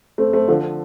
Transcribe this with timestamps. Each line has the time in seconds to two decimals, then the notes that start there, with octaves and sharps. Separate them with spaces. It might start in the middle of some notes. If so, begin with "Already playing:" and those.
0.18 A3 C4
0.33 A3 C4
0.48 D3 F3